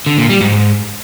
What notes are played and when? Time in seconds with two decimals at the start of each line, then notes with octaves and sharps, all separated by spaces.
0.06 D3
0.18 A#2
0.29 G3
0.41 G#2
0.52 G#2